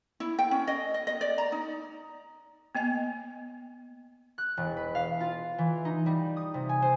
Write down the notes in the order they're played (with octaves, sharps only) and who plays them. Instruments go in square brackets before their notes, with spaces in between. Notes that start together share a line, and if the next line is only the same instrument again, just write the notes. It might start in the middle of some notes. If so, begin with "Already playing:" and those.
[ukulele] E4
G5
C#4
D#5
D#5
D#5
D5
A#5
D#4
[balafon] A#3 B3 D#5 G#5
[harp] F#6
E1
B4
F5
F4
E3
D#4
G3
D#6
C3
G#5
C5